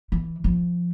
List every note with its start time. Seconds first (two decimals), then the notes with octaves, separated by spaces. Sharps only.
0.12 E3
0.44 F3